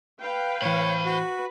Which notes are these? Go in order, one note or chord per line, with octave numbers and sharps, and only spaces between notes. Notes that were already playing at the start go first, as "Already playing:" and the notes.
B4 F5 G5
A2 E3 C5 C#5 B5
F#4 B4